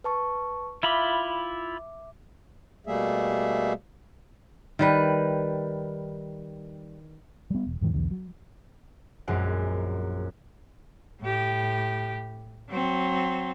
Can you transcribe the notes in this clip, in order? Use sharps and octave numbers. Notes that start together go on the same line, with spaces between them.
B4 A5 C#6
E4 F4 E5 B5 D6
B2 G3 A3 A#3 G#4 E5
D#3 G3 B4
G3 B3
E1
E2 G#2 D#3
B1 E2 D3
F#3
A#1 F#2 G#3 C4 F#5
A2 G4
F#3 C4